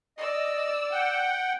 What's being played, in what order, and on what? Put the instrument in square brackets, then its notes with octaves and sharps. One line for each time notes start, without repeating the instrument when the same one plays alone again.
[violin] D5 E6 [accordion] D#5
[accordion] F#5 G5